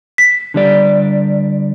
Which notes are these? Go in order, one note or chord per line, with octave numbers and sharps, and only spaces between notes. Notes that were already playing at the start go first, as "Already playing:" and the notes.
B6
D3 G3 D5